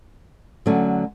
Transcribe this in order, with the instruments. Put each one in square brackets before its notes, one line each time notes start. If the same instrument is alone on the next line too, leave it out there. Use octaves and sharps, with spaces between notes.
[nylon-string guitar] D3 F#3 A3 C#4